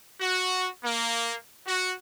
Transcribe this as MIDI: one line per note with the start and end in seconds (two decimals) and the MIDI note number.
0.20 0.66 66
0.84 1.33 58
1.65 1.94 66